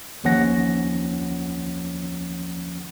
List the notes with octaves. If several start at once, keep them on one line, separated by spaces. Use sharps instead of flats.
A1 D#2 F3 C#4 F#5 A#6